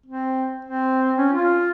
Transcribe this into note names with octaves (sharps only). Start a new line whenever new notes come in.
C4
C4
C#4
F4